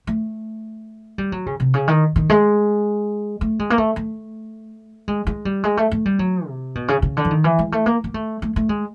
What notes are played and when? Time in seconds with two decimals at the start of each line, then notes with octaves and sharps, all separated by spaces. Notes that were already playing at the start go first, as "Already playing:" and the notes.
0.07 A3
1.18 G3
1.32 F#3
1.46 C#3
1.60 C3
1.74 C#3
1.88 D#3
2.16 D#3
2.30 G#3
3.41 A3
3.59 G#3
3.70 A#3
3.78 A3
3.96 A3
5.08 G#3
5.27 G#3
5.45 G3
5.64 G#3
5.77 A3
5.91 A3
6.05 G3
6.19 F#3
6.47 C3
6.75 B2
6.88 C#3
7.02 C#3
7.17 D3
7.25 E3
7.31 D#3
7.44 E3
7.59 G#3
7.72 A3
7.86 A#3
8.04 A#3
8.14 A3
8.42 A3
8.56 A3
8.69 G#3